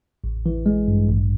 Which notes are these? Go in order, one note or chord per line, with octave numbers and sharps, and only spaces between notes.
A1
E3
G#3
G2
A1